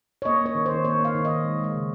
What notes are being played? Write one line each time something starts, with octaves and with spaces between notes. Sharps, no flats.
C#5
A#3 D#5
A#3 C#5
D#3
C5
D#3
A#3 C#5
A#3
F5
D#3
D#5
D#3
G#3
G#3
D#5
C#3